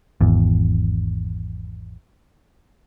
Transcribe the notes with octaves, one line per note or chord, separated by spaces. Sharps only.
G#1 E2